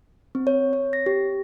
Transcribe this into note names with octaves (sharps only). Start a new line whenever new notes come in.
C4
C#5
C#5
A#6
G4